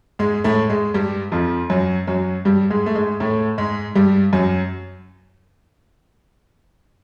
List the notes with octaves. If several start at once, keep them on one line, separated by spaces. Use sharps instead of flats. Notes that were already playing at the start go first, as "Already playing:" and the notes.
G#2 G#3
A2 A3
G#2 G#3
G2 G3
F2 F3
F#2 F#3
F#2 F#3
G2 G3
G#2 G#3
A3
G#2 G#3
A2 A3
G#2 G#3
G2 G3
F#2 F#3